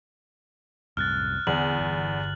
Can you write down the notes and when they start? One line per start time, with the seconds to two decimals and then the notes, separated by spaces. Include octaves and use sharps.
0.97 C2 F#2 A2 F6 F#6 A6
1.47 E2 D3 E3 B3 F#7
1.78 G1